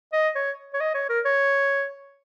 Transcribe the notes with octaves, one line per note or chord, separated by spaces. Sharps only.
D#5
C#5
C#5
D#5
C#5
A#4
C#5